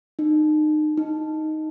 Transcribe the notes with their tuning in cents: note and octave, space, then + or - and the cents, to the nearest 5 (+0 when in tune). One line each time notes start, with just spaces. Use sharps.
D#4 -30
D#4 +0